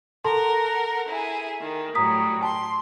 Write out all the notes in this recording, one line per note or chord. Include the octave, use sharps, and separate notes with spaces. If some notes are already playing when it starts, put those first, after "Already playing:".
A4 A#4 F#5 A5 C6
E4 G#4
D#3
A2 F#3 G3 A#5 D#6 B6
A5 C6